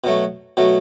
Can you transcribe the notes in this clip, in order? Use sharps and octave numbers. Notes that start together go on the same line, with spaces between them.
B2 F#3 A3
B2 F#3 A3